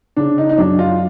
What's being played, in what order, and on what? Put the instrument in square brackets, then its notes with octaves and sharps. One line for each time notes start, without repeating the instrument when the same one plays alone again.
[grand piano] C#3 [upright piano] D4
[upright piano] D#4
D#4
[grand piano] F#2 [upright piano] D4
[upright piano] F4